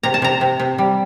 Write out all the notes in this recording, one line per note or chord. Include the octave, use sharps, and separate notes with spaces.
C3 A#5
A5
C3 A#5
C3
C3
G3